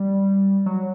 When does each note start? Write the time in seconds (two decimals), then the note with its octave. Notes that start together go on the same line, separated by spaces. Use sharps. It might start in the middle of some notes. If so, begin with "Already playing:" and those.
Already playing: G3
0.66 F#3